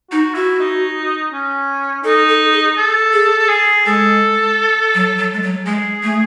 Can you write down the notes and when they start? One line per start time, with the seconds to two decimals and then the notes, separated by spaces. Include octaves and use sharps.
0.11 D#4 F#4
0.35 E4 F#4
0.60 D#4
1.31 C#4
2.04 D#4 A4
2.29 A4
2.53 G#4
2.77 A4
3.13 G#4
3.39 A4
3.49 G#4
3.86 G#3 A4
4.95 F#3
5.18 F#3
5.33 G#3
5.42 F#3
5.66 G#3 G#4
6.03 A3